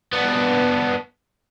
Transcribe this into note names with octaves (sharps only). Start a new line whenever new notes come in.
B3 D4